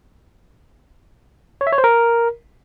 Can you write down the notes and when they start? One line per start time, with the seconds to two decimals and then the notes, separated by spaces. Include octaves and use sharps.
1.61 C#5
1.67 E5
1.72 C#5
1.78 C5
1.84 A#4